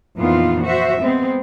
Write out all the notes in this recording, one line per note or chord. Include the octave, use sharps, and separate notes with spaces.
F2 A#2 E3 B3 D#4 F4
F#4 C5 E5
G#3 B3 C4